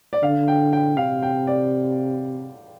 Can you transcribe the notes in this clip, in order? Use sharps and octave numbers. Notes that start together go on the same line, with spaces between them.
D5
D3 F5
G5
G5
C3 F5
G5
D5